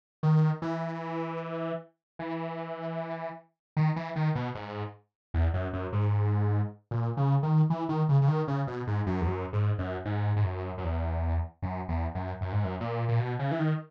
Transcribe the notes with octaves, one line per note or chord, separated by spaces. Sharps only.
D#3
E3
E3
D#3
E3
D#3
B2
G#2
E2
F#2
F#2
G#2
A#2
C#3
D#3
E3
D#3
C#3
C#3
D#3
C#3
B2
G#2
F#2
E2
F#2
G#2
F#2
G#2
G#2
F#2
F#2
E2
F#2
E2
F#2
F#2
G#2
F#2
A#2
A#2
B2
C#3
E3
D#3